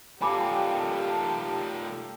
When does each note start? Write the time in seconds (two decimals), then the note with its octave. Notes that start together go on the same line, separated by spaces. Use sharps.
0.22 A3 F4 G4 A#4 G#5 A5 B5 D6